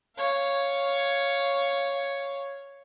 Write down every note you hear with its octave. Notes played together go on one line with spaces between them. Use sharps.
C#5 F5